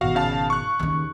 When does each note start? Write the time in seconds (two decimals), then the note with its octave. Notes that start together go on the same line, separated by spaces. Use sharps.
0.01 G#1 B2 F#4 F5
0.15 C#3 F5 A5
0.50 C#6 F#6
0.79 D#2 C#3